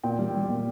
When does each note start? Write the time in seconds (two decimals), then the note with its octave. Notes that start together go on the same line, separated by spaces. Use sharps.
0.03 A#2 G5
0.19 G3
0.34 G3
0.49 A#2